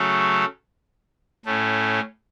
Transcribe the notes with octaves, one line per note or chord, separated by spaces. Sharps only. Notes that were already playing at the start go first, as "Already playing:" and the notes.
Already playing: C#3 F#3 A3 C#4 A4
A2 A3 C#4